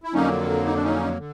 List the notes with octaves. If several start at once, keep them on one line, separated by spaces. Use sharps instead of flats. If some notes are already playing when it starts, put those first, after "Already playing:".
E4
F2 D3 F#3 A#3 C#4 D#4
D#4
D4
C#4 D#4
D3